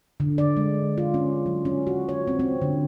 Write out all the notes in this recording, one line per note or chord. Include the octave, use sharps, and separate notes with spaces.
D3
D5
G#3
F4
C#4
F#3
C#4
F#4
C#5
C4
C4
D3